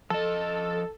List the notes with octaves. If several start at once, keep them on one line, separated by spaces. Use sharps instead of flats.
F3 A4 D#5